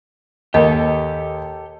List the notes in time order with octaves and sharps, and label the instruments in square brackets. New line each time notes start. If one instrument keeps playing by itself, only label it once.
[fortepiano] D#2 [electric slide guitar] G4 A4 [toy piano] D#5